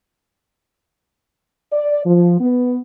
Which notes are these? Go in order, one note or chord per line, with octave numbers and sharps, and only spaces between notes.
D5
F3
B3